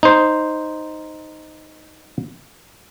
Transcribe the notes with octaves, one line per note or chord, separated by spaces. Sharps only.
D#4 C5